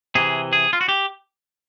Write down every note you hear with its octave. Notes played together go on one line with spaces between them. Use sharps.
C3 E3 G#4
G#4
F4
F#4
G4